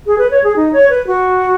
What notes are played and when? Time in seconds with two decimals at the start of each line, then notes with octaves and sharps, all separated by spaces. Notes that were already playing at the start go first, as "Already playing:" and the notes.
0.07 G#4
0.18 B4
0.31 C#5
0.44 G#4
0.56 D#4
0.73 C#5
0.90 B4
1.07 F#4